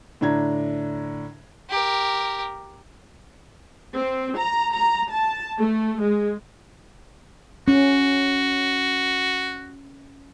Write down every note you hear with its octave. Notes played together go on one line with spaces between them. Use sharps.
A2 D3 D4 A#5 G#6
G4 A#4
C4
A#5
A#5
A5
A3
G#3
C#4 F#4